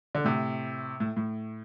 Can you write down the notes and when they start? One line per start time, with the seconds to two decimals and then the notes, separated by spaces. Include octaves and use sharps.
0.15 D3
0.25 A2 C3
1.00 A2
1.17 A2